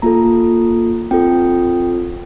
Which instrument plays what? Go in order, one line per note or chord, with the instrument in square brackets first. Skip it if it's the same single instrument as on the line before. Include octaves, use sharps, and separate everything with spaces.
[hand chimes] A#3 F4 A4 A#5
C4 F4 A4 G5